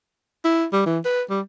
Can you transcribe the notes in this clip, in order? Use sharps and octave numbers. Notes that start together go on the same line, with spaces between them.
E4
G3
E3
B4
G3